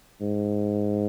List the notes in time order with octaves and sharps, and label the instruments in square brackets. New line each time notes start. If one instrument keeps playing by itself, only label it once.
[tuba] G#2